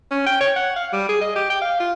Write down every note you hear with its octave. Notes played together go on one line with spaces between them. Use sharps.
C#4
G5
C#5
F#5
F5
G3
G#4
D#5
G4
G5
F5
F4